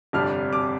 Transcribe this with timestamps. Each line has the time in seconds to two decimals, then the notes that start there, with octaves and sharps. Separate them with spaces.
0.13 G1 F2 C3 G3 D4 F6
0.53 D6